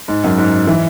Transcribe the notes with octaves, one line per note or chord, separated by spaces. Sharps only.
G#2
F#2
G#2
E3